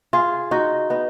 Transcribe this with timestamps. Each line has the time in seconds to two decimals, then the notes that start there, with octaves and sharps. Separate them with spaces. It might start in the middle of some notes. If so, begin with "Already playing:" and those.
0.13 F4 G#4
0.51 D#4 F#4
0.90 B3 D#4